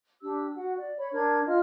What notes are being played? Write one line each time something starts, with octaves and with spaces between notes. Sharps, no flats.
D4 G4 E6
F#4 F#5
D5
C#5 B5
D4 A#4 G#6
F4 D#5 F6